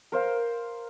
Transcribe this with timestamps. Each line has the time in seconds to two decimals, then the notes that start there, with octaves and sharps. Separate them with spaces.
0.12 A#4 C5 F5